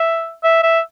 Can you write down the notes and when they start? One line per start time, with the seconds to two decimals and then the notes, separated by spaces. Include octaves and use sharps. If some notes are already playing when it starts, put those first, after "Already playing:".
Already playing: E5
0.43 E5
0.63 E5